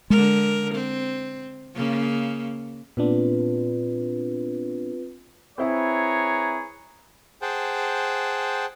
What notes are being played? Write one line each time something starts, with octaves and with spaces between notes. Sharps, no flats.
D3 G#3 A#4
C4
C#3 A#3
A#2 B3 C4 D4 F4 B4
C4 E4 G#4 B4 C#5 A#5
G#4 C5 F#5 G5 A5